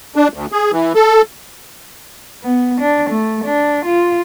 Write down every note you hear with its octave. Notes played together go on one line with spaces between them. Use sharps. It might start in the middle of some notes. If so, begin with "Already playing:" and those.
D4
D2
G#4
E3
A4
B3
D4
A3
D4
F4